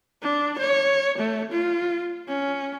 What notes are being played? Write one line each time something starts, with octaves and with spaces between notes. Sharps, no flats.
D4
C#5
A3
F4
C#4